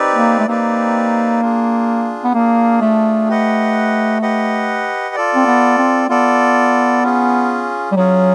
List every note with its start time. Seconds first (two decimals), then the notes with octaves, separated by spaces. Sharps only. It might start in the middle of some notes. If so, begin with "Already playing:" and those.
Already playing: C4 D#4 G4 B4 D5
0.15 A#3
0.39 A3
0.46 A#3 C4 D#4 G4 B4 D5
1.41 D4 F4 G#4
2.24 B3
2.34 A#3 D4 F4 G#4
2.82 A3
3.29 G4 B4 D#5 F#5
4.22 G4 B4 D#5 F#5
5.15 F4 A4 D5
5.35 C4
5.47 B3
5.78 C4
6.09 B3 F4 A4 D5
7.03 C#4 F4 G#4
7.92 G3
7.97 F#3 C#4 F4 G#4